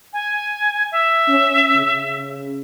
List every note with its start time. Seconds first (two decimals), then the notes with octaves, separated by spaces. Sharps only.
0.13 G#5
0.92 E5
1.28 C#4
1.76 C#3